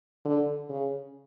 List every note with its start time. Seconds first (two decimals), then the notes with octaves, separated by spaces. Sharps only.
0.25 D3
0.70 C#3